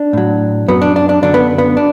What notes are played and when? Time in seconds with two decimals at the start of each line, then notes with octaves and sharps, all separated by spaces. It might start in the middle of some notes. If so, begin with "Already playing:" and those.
Already playing: D4
0.13 A2 F#3
0.68 F#2 F#3 B3
0.82 D4
0.96 D4
1.09 D4
1.22 F#2 D3 F#3 D4
1.34 B3
1.58 B3
1.77 D4